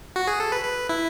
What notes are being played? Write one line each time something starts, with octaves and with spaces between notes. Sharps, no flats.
F#4
G#4
A4
B4
B4
E4